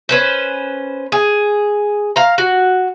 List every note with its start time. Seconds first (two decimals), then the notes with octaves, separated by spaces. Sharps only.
0.09 C#4 B4 C5
1.12 G#4
2.16 F5 A#5
2.38 F#4